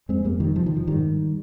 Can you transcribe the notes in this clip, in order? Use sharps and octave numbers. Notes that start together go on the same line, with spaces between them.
F2 G#3 C4
F2 G3 A#3
C3 D#3 G3
C3 F3
D#3
F2 F3
G#2 D#3 G3
G#2